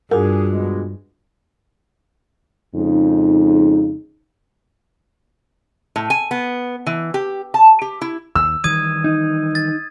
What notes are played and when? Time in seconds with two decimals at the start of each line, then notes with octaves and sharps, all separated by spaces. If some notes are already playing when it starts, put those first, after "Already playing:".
0.11 G2 D4 F4 F#4 G#4 A#4
0.51 B2 G#3
2.74 F2 C#3 G#3 D#4
5.96 A2
6.10 G#5
6.31 B3
6.87 E3
7.14 G4
7.54 A5
7.82 G4
8.01 E4
8.35 D#2 E6
8.64 D#3 E3 G3 D#6 G#6 D#7
9.04 D#4
9.55 A6